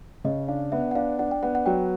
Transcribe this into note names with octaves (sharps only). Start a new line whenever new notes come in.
C#3 D#5
D4 F5
B3 E5
F#5
D4 F5
D4 F#5
G5
B3 F#5
F#5
F#3 G5